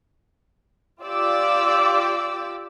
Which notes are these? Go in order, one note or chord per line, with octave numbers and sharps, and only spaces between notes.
F4 G4 D5 D6 E6